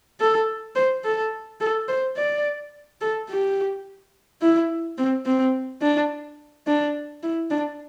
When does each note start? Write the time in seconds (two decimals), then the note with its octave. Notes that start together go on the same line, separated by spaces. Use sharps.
0.20 A4
0.76 C5
1.04 A4
1.61 A4
1.88 C5
2.17 D5
3.01 A4
3.29 G4
4.42 E4
4.98 C4
5.26 C4
5.82 D4
6.67 D4
7.23 E4
7.51 D4